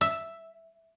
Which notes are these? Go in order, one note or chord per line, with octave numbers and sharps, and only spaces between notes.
E5